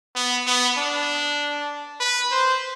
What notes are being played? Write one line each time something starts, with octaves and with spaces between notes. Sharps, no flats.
B3
B3
D4
B4
C5